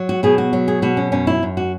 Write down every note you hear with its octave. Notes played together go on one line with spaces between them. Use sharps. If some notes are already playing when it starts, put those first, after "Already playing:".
Already playing: F#3
F#4
B2 G#4
F#4
F#3
G#4
B2 F#4
C#4
F#2 C#4
E4
F#2
F#4